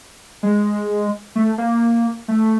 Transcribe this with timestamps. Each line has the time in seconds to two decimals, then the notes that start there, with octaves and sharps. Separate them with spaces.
0.43 G#3
1.36 A3
1.58 A#3
2.28 A3